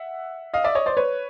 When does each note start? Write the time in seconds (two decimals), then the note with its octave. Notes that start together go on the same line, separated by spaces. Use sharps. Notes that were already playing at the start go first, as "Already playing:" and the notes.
Already playing: E5 F#5
0.54 D#5 F5
0.64 D5 E5
0.75 C#5 D#5
0.86 C5 D5
0.97 B4 C#5